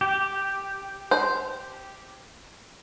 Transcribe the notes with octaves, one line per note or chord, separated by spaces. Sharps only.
G4
C5